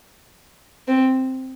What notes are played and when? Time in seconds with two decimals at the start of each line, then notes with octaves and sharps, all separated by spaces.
0.88 C4